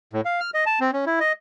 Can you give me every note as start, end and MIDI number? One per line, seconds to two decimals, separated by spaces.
0.13 0.21 45
0.25 0.40 77
0.40 0.50 89
0.54 0.65 75
0.66 0.79 81
0.80 0.91 60
0.93 1.05 61
1.06 1.19 64
1.20 1.32 75